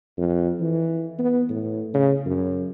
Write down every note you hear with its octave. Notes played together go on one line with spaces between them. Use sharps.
F2
E3
B3
A2
C#3
F#2